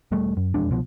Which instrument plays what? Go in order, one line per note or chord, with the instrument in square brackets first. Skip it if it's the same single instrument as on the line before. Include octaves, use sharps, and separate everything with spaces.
[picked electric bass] E1 G3 A3
F#2
E1 F2 G#3 D4
C2 B2 F3